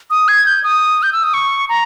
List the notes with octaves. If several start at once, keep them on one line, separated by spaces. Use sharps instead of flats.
D#6
G#6
G6
D#6
G6
E6
D#6
C#6
A#5